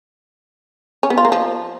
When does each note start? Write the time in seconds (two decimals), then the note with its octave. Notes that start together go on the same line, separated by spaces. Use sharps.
1.03 C#4
1.10 B3
1.18 F4
1.25 A#3
1.32 F3